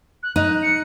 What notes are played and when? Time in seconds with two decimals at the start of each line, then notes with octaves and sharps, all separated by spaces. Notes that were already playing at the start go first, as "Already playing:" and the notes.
0.23 F#6
0.36 D#4 F#6
0.62 C#7